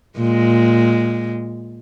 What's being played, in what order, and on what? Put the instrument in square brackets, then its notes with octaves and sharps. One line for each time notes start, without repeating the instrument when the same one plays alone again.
[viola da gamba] A#2 G#3